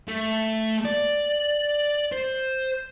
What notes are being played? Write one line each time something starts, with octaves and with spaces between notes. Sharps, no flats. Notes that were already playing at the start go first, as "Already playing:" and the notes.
A3
D5
C5